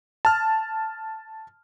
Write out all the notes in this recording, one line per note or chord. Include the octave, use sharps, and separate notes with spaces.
A5 F6